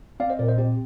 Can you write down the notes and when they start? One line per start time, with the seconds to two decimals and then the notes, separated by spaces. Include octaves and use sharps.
0.20 C4 D5 F5
0.30 C5 D#5
0.39 A#2 A#4 D5
0.48 C5 D#5
0.58 C4 G4